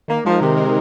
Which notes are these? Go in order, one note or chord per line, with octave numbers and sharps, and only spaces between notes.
D#3 A#3
F3 G#3 D#4 A#4
C3 D#3
G#3 D#4 A#4